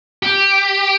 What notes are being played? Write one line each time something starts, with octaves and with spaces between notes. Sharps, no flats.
G4